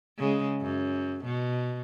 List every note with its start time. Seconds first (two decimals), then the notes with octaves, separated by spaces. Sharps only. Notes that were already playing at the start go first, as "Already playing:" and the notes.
0.18 C#3 G#3
0.61 F#2
1.25 B2